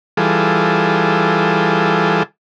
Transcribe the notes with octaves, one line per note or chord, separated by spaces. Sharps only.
E3 G3 F4 G#4 A4